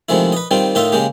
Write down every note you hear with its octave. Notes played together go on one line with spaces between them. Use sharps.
C3 D#3 F3 G#3 A3 E4
B4 D#5
D#3 G3 C4 F4
A2 D#3 D#4 F4 D#5 E5
C#3 G#3 A#3 G4